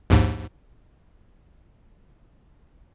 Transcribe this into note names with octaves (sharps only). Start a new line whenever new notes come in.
A#1 D#2 G#2